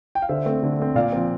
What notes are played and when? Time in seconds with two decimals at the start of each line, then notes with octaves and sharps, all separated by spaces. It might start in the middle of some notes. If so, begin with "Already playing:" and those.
0.15 G5
0.22 F5
0.29 D3 C5 E5
0.46 A3 C4
0.63 D3
0.79 A3 C4
0.95 A#2 D5 F5
1.12 F3 C4